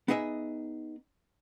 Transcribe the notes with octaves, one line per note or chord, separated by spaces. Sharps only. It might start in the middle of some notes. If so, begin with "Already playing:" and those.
B3 D#4 G#4 D#5 E5